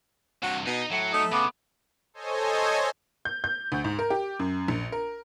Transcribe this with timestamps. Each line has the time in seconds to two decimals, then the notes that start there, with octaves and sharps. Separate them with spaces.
0.43 G2 C3 F#4
0.66 B2 D#4 D#5
0.92 A2 F#3 C#7
1.14 A3 D#4
1.32 C#3 B3 D6
2.14 A4 C5 C#5 D#5 G#5
3.25 G6
3.44 G6
3.72 D2
3.84 G#2
3.99 A#4
4.10 G4
4.39 F#2
4.68 A#1
4.92 A#4